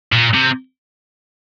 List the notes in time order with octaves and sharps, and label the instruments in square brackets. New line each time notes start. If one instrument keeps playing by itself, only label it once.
[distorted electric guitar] A#2
C3